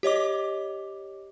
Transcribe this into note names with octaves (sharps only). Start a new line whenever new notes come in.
G4 C#5 D#5 D6